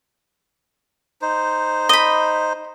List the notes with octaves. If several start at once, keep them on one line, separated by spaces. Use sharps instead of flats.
D#4 C5
D#5 B5